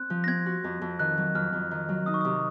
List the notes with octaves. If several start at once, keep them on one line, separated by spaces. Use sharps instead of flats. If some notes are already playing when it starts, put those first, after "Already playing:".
Already playing: C4 F#6
F3
A#6
C4 G#6
F#4
F2
F2
D#3 F#6
F#3
F2 F6
F2
D#3
F#3
D#4 D#6
C#6
C3 D#6